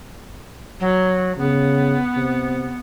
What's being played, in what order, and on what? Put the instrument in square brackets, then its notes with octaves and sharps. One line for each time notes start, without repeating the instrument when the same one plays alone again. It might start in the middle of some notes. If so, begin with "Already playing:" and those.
[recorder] F#3
[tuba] C#3 [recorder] B3
[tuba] C3